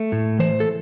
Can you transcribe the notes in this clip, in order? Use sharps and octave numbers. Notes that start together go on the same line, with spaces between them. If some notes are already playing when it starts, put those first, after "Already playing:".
Already playing: A3
A2
E3 C5
A4